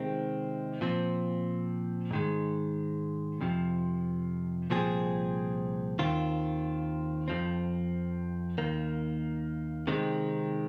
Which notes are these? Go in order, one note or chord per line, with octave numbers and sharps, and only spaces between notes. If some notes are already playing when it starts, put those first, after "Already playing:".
Already playing: C3 D#3 G#3 C4
A#2 F3 C4
G#2 D#3 G#3
F2 C3 F3
C2 A#2 F3 C4 G#4
D#2 D#3 C4 F4
F2 F3 C4
D#2 D#3 A#3
C3 D#3 G#3 C4